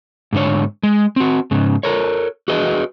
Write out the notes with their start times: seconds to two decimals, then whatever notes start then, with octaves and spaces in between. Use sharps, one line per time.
0.33 G#2 D3 C#5
0.83 G#3
1.16 C4 F#4
1.51 G#2 C#3
1.83 A4 A#4 C#5
2.48 F#4 G#4 B4 D#5